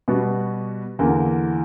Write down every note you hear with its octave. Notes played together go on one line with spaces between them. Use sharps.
B2 G3 B3 F#4
E2 D3 A#3